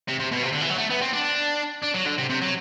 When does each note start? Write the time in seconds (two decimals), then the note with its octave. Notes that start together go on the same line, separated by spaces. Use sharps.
0.08 C3
0.20 C3
0.32 B2
0.43 C3
0.52 D3
0.61 E3
0.70 F#3
0.78 A3
0.90 B3
1.01 C4
1.13 D4
1.83 D4
1.95 F#3
2.07 D3
2.18 C3
2.30 C3
2.42 F#3